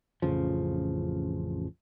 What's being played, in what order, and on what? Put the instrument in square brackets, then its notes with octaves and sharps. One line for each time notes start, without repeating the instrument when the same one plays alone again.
[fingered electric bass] A1 F2 C#3 F3